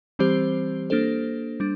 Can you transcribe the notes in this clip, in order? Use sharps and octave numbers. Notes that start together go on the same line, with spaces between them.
E3 G3 C4 G4 C5
A#3 D4 A4 C5
G3 D4